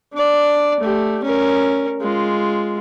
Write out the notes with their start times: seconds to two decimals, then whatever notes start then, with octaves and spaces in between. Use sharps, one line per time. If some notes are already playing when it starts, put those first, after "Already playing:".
0.13 D4 D5
0.80 A3 G4
1.24 C#4 A#4
2.01 G#3 F4